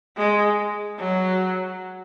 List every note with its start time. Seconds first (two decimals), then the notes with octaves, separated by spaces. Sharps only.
0.17 G#3
0.99 F#3